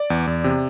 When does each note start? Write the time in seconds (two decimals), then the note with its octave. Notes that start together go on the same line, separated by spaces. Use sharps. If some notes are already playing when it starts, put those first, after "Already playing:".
Already playing: D5
0.10 E2
0.27 E2
0.44 C3